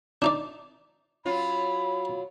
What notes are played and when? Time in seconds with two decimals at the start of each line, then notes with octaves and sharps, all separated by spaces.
0.22 D4 D#4 D5
1.25 F#3 F4 B5